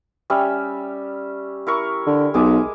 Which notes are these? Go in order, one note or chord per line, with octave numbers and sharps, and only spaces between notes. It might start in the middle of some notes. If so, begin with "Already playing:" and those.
G3 C#4 E5
E4 A#4 C#6
D3
B1 G#3 G#5 D6